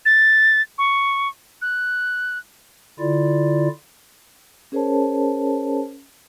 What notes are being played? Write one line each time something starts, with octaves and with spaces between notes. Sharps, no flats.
A6
C#6
F#6
D3 E4 F4 D5
C#4 G#4 A#4 C5 C#5 A5